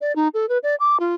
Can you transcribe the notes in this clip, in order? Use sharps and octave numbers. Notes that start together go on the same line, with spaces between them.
D5
D#4
A4
B4
D5
D6
F4